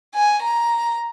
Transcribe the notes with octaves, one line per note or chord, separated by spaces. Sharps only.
G#5
A#5